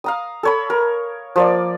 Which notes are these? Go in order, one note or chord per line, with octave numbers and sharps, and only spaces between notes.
F5 A#5 D#6
A4 C#5 B5
A#4
F3 A#3 D5